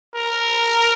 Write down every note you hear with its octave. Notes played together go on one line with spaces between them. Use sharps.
A#4